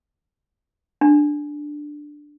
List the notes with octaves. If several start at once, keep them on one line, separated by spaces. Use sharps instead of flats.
D4